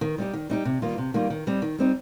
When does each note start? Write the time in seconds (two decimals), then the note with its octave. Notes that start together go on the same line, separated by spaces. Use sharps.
0.01 D#3
0.18 G3 D#4 G4
0.33 D#3
0.50 G3 D#4 G4
0.65 C3
0.82 D#3 G3 A#3 F4
0.98 C3
1.14 D#3 G3 A#3 F4
1.30 D#3
1.47 G3 C4 D#4
1.62 D#3
1.78 G3 C4 D#4